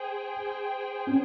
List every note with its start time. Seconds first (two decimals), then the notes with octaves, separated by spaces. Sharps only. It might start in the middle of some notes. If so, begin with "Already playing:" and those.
Already playing: G#4 C5 G5
1.07 C#4